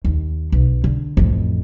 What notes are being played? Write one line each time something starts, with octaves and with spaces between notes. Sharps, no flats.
D#2
B1
D3
A1 F2